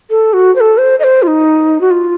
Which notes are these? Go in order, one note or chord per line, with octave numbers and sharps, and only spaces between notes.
A4
F#4
C5
A4
C5
D#5
C5
F4
D#4
F#4
F4